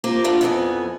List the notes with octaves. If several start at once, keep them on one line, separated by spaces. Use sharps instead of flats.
A#3 F4 G4 A#4 C5
A3 D4 F4 F#4
F2 E3 A3 B3 G#4 G#5